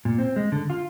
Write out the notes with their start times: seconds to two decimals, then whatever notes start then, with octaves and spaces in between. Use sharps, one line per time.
0.05 A#2
0.18 C4
0.36 G#3
0.52 D3
0.70 F4